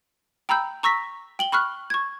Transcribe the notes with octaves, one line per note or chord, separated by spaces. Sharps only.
G5 A#5 B5 E6 G6
A#5 C#6 E6 A#6 B6
G5 F#7 G7
B5 C#6 F6 F#6
C#6 G#6